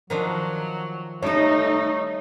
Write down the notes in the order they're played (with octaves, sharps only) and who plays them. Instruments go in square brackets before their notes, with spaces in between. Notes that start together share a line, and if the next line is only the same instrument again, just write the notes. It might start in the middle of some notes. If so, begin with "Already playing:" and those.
[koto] D#3 F3 D4 [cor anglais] F#3
[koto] G3 A4 [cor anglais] A3 [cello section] D#4 [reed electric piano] C#5